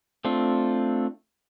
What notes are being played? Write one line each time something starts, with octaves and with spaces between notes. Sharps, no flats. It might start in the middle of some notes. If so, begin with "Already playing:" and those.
A3 C4 D4 F4